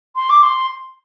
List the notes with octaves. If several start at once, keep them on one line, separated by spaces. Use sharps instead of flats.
C6
D6
C6